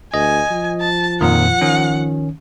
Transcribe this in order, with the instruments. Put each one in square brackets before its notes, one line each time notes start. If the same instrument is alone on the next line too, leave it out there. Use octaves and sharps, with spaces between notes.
[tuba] D2 [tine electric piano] D#5 [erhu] G#5
[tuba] F3
[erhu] A5
[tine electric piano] F2 A#2 D#3 [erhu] F#5
[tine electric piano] D#3 C#4